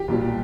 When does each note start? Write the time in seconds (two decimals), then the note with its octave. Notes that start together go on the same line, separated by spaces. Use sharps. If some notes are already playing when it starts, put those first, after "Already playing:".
Already playing: G4
0.08 B1 A#2 G3